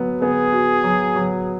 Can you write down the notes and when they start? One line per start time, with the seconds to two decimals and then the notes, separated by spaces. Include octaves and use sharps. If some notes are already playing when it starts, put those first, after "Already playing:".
Already playing: F#3 B3
0.22 B3 G#4
0.52 F#4
0.84 F#3
1.15 F#3